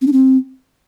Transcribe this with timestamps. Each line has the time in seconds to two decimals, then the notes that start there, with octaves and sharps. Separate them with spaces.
0.01 C4
0.07 D4
0.13 C4